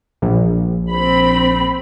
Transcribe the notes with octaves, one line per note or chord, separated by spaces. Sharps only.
A#1
C4 B5